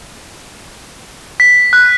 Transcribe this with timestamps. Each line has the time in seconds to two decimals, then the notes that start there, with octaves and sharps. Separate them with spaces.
1.40 B6
1.73 F#6